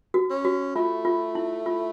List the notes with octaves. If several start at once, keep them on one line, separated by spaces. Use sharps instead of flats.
F#4
C#4
F#4
A3 F4
F4
E4
F4